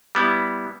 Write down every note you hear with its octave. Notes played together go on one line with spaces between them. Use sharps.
G3 B3 E4